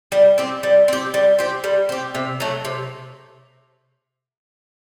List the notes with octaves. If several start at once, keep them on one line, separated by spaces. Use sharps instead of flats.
G3
C4 G4
G3
C4 G4
G3
C4 G4
G3
C4 G4
C3
F#3 A3
C3